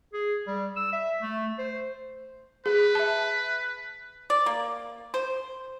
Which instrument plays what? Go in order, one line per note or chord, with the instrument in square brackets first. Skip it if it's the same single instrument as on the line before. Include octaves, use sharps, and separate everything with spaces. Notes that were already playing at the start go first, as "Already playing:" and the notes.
[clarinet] G#4
G3
E6
E5
A3
C5
[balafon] G#4 [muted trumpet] B4
[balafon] E5 A5
[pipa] D5
A#3
C5